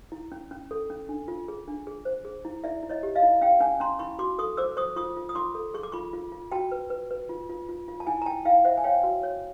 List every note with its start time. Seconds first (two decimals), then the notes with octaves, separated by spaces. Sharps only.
0.12 E4
0.32 C#4
0.51 C#4
0.71 A4
0.90 C#4
1.09 D4
1.28 F4
1.48 G#4
1.68 D4
1.87 G#4
2.05 C5
2.25 G#4
2.45 E4
2.64 E4 D5 E5
2.83 E4
2.89 C#5 D#5
3.03 G4
3.15 D#5 F5
3.23 E4
3.41 C#4 F5 G5
3.60 C#4 F#5 G#5
3.80 C#4 A#5 C6
3.99 E4 B5 C#6
4.19 F#4 C6 D6
4.38 A4 C#6 D#6
4.57 C5 D6 E6
4.77 C5 C#6 D#6
4.96 F4 C#6 D#6
5.17 F4
5.29 D#6
5.35 F4 C6 D6
5.55 A4
5.74 G#4 C#6
5.83 D6
5.92 F4 B5 C#6
6.13 F4
6.32 F4
6.52 F#4 G5 A5
6.71 B4
6.90 B4
7.11 B4
7.29 F4
7.49 F4
7.69 F4
7.88 F4
8.00 A5
8.06 E4 F#5 G#5
8.22 A#5
8.26 E4 G5 A5
8.45 E4 F5 G5
8.65 C5 E5 F#5
8.78 G#5
8.84 C#5 F5 G5
9.03 F#4
9.23 C#5